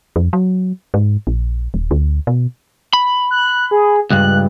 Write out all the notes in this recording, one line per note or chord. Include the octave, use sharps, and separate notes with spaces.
F2
F#3
G#2
A#1
D#1
D2
B2
B5
F#6
G#4
C#2 G2 F#6